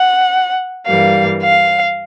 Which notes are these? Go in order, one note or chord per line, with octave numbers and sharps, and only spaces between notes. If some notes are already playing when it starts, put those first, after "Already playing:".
Already playing: F#5
G2 E3 G3 A#3 F5
F5